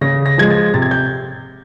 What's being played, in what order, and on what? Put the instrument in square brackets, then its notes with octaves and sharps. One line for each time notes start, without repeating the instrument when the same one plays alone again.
[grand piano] C#3 A#6
A#6
F3 G#3 G#6
A6
C3 A6
G#6
G6